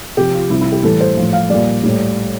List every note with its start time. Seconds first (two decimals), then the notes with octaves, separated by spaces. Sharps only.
0.17 C3 F3 G4
0.34 F4
0.50 C3 G3 E4
0.61 E4
0.72 G4
0.83 A2 E3 G3 A4
1.01 C5
1.17 A2 F3
1.33 F5
1.50 A#2 G3 D5
1.83 A2 G3